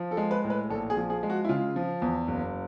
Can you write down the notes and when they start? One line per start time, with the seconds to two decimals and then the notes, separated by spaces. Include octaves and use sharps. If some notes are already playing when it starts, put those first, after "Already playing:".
Already playing: F3
0.11 A4
0.17 G#3
0.31 B4
0.44 A2
0.50 B4
0.70 A#1 A4
0.90 G#4
0.97 F3
1.10 G#4
1.23 G#3
1.30 F#4
1.45 E4
1.49 C#3 F4
1.76 F3
2.02 E2
2.28 F#1